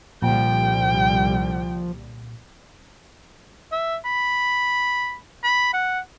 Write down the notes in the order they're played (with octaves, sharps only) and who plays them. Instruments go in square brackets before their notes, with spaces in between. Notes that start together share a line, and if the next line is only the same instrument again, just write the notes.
[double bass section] C2 D3 G3 [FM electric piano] A#2 [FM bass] F3 [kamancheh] G5
[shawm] E5
B5
B5
F#5